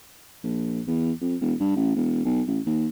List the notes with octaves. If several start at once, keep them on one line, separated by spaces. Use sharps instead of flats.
A#1
E2
F2
E1
G2
A1
E1
B1
A1
D#2